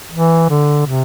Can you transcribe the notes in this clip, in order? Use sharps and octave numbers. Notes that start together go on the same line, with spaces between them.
E3
D3
C3